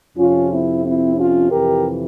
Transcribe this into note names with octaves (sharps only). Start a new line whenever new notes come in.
F2 C3 F3 C#4 F4
C4 E4
C4 E4
C#4 F4
F2 C3 E3 G4 A#4